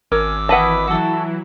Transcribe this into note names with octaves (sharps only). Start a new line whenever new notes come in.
G#1 C#4 A#4 D6 E6
E3 E4 B4 D#5 F#5 A5
E3 F#3 E4 F#4 A4